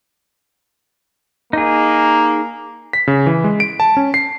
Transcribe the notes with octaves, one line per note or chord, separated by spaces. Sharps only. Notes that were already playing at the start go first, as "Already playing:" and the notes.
A#3 D#4 G#4
B6
C#3
E3
G#3
D7
A5
C#4
C7